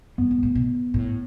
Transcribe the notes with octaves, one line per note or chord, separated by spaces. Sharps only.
G2 B3
G2
A2
B2
A2